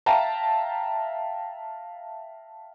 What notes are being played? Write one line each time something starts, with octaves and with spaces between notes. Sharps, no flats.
E5 F5 G5 A5 A#5